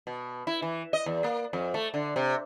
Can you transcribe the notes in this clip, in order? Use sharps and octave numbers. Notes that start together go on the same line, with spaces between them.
B2
E4
E3
D#5
E2
A#3
F2
A3
D3
C3